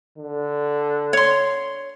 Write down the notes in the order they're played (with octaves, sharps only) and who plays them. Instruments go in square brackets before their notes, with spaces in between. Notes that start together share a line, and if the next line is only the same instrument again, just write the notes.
[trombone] D3
[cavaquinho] C#5 C6